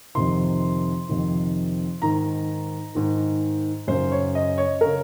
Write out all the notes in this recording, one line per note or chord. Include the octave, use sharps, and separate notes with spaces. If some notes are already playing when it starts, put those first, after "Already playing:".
F2 C3 D#3 C6
F2 C3 D#3
G#2 D#3 A#5
G#2 D#3
F#2 C#3 C5
C#5
D#5
C#5
C#3 A#4